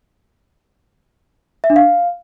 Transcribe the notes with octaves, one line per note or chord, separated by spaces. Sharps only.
E5
D4
F5